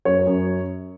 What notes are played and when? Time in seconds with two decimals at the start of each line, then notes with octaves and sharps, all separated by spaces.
0.05 F#2 C#5
0.27 F#2